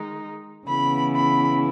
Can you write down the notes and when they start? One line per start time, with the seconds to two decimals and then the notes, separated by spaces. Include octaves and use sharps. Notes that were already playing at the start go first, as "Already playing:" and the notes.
Already playing: D#3 G#3 D#4
0.67 C#3 E3 B3 E4 B5
1.15 B5